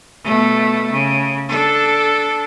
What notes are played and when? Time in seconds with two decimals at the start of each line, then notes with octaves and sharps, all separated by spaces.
0.24 B2 A3
0.91 C#3
1.48 D4 A4